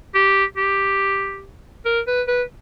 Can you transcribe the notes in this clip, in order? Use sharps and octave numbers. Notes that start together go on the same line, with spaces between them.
G4
G4
A#4
B4
B4